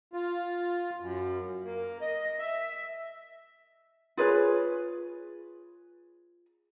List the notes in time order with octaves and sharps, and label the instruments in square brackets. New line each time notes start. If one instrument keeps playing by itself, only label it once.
[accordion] F4
F#2
A#3
D#5
E5
[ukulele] F4 G#4 B4 C#5